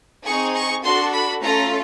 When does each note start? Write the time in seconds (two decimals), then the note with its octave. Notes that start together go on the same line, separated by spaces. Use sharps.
0.24 C4 D#4 G#4 C#6
0.54 C#6
0.83 D4 F#4 A4 C6
1.12 B5
1.41 A3 C#4 F4 A4 A#5